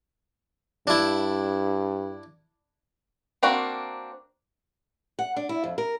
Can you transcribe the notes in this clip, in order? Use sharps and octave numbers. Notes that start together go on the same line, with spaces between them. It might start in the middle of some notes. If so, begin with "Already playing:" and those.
G2 D4 E4
A#3 C4 D4 F#4
F#5
D4
E4
F2
A#4